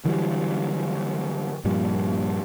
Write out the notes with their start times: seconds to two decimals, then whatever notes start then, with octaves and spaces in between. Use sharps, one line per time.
0.05 D3 E3 F#3 G3
1.65 G2 A#2 F3 G3